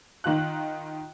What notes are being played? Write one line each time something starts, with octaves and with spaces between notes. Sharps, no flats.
D#3 F4 F#6